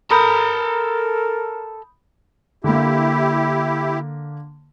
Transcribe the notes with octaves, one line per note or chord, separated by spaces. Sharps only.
A4 A#4 A#5 B5 D#6 G6
D3 A#3 E4 G4